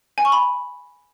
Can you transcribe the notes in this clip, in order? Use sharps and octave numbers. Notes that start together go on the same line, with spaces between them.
G#5
C#6
B5